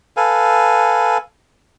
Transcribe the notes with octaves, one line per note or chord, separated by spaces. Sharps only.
A4 B4 F5 G#5